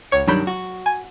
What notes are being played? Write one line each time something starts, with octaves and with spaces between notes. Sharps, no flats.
C#2 C#5 C#7
G2 D#3 F#3 D4 B5 G6
F#4
G#5